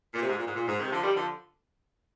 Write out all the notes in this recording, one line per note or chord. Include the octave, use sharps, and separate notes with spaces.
A#2
C3
G#2
A#2
G#2
A#2
G#2
C3 D#3
D3 F3
D#3 G3
D3 F3